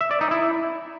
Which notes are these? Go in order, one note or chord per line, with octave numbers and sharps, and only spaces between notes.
E5
D5
D#4
E4